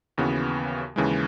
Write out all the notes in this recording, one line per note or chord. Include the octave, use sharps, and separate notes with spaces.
D#2 C#3 E3 B3 F#4
D#2 C#3 E3 G#3